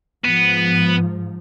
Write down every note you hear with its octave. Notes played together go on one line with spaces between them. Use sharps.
G#2 F3 B3